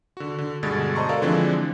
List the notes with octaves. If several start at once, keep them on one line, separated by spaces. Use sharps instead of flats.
D3 F#4
D3
G2 B2 D3 G#3 G#6 A6
C5 D#5 A5 A#5 C6 C#6
F#4 A4 A#4 D5 F5
D3 E3 F3 G#3 C4 D4